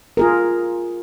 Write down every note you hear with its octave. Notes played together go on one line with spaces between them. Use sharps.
F4 G#4 A#4